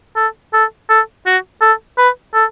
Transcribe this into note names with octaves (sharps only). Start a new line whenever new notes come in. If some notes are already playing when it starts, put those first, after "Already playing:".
A4
A4
A4
F#4
A4
B4
A4